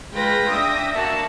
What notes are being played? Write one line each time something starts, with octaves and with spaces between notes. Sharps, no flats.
G#3 F4 B4 G5 A#6
D4 E5 D#6
A#3 F#4 A5